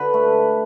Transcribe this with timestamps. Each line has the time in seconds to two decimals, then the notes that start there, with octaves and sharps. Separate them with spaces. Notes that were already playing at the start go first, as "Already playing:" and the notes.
Already playing: D3 B4
0.14 A3